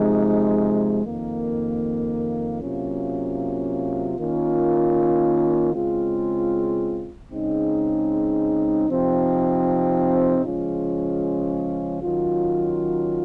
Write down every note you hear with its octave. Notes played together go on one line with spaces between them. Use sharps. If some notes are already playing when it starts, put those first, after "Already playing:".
Already playing: C3 F3 G#3 D#4
F2 D#3 A#3
C3 F#3 A#3 C#4 F4
D#3 A#3 C#4 F4
C#3 G#3 C4 F4
C#3 G#3 C4 D#4
C3 F3 C4 D#4
C#3 F3 G#3 C#4 F4
D#3 F#3 C#4 F4